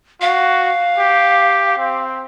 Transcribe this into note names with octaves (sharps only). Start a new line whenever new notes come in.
F#4 F5
G4
C4